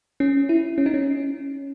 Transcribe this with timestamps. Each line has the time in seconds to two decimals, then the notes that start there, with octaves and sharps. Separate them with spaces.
0.20 C#4
0.49 E4
0.78 C#4
0.86 D#4
0.94 C#4